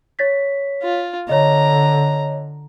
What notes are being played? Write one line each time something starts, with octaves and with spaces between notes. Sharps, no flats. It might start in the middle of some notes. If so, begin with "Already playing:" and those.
C#5 A6 B6
F4
D3 C#5 D#5 A#5